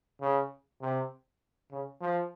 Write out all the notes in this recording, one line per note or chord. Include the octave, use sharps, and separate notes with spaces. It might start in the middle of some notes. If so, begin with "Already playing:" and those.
C#3
C3
C#3
F3